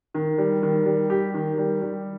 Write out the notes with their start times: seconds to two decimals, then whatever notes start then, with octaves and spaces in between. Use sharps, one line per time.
0.14 D#3
0.38 G3
0.63 D#3
0.86 G3
1.10 G4
1.34 D#3
1.58 G3
1.82 G3